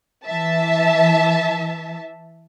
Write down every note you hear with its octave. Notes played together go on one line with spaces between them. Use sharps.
E3 E5 A5